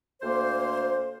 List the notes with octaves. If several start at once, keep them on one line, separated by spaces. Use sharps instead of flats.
D2 A#3 C5